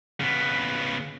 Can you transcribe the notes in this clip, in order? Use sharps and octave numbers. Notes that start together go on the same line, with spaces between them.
C#3 B3